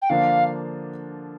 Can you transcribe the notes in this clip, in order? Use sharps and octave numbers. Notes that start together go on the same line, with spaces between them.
G5
D3 F3 A#3 D4 F5